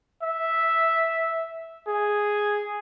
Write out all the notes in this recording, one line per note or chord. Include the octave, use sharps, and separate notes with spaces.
E5
G#4